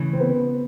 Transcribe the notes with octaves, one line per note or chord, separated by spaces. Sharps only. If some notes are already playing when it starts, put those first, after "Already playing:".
Already playing: C#3 E3 A3
C4
B3